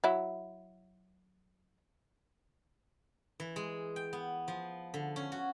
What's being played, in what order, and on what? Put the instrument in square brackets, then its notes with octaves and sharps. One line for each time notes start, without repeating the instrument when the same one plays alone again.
[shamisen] F#3 E4
[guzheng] E3
G#3
G5
B3
F3
D3
C#4
F#4